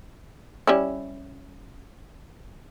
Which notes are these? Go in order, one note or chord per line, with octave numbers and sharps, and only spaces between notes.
G3 C#4 E4